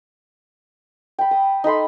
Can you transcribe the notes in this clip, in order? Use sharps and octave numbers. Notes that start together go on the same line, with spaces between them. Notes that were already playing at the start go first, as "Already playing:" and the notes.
G5 B5
D#6
D#4 A4 B5 C6